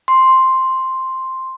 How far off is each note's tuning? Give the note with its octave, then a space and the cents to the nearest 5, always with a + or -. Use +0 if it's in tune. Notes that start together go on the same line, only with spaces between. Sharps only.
C6 +0